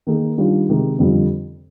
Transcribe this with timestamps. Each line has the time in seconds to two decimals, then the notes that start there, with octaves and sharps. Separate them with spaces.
0.07 D#3 A#3 D#4 G#4
0.37 D#3 G3 D4 F4
0.68 C3 D#3 G#3 D#4 G4
0.98 F2 D3 G3 C4 F4